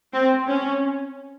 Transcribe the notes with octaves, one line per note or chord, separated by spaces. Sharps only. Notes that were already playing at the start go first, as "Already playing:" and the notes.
C4
C#4